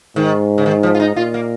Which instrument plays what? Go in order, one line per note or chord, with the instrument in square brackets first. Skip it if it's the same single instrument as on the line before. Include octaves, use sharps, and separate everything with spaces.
[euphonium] G#2 [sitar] D#3
[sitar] C#3
D#3
F3
F4
D#4
[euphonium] A#2 [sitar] F4
[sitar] A#3